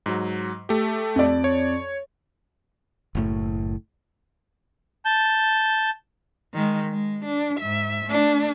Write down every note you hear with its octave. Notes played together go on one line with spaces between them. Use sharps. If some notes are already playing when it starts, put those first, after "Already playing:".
G#2 F#3
A3 G4
F2 D5
C#5
F#1 A2 A3
A5 G6
D#3 G#3
G#3
D4
G#2 E5
A3 D4